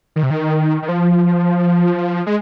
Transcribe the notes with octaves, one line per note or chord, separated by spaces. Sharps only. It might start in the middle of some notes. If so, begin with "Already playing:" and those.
D#3
C3
D#3
D#3
F3
G#3